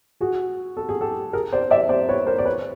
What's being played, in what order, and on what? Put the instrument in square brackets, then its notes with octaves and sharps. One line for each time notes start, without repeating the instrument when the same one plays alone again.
[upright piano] F#4 G#4
A4
G#4
G4 A4
G#4 A#4
C5 D5
D5 E5
C5 D5
B4 C#5
A#4 C5
D5
B4 C#5